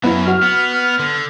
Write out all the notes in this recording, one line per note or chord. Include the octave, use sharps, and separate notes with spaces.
F#2 F#3 B3 E4
F#4 F6
B3
D3